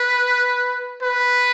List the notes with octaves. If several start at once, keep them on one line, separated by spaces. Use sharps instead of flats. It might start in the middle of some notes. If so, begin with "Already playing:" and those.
Already playing: B4
B4